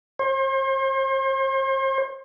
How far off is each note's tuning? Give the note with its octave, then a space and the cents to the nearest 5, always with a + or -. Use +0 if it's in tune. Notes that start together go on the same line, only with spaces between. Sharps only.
C5 +40